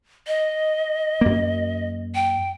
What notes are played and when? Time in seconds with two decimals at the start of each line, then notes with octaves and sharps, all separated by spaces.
0.27 D#5
1.21 F#2 A#3
2.15 G5